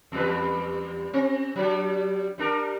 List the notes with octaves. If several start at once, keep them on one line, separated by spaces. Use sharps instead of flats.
E2 G3 B4
C4
F#3 G3 D4
G3 D4 A#4